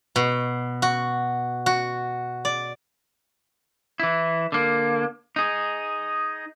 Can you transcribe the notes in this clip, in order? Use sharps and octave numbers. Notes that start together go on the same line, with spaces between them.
B2
F#4
F#4
D5
E3 E4
D3 A#3
D#4 G#4